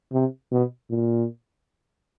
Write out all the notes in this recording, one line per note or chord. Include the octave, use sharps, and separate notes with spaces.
C3
B2
A#2